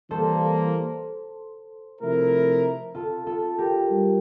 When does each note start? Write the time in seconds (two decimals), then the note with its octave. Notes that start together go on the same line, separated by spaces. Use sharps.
0.10 E3 G3 A#3 A4 C5
2.01 C3 F3 A3 E4 A#4
2.95 F4 A4
3.26 F4 A4
3.58 G4 A#4
3.90 G3